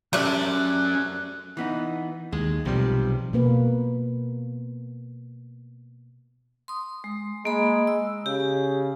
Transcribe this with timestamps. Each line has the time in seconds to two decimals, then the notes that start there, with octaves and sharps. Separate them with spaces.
0.13 C3 F#3 A3 C#4 D4 F#6
1.57 E3 B3 D#4
2.32 D#2 G#3
2.65 B1 C3 F3 G3
3.33 B2 A#3 B4
6.68 C6 D#6
7.04 G#3
7.45 G#3 A#3 B5
7.87 E6
8.26 C#3 G4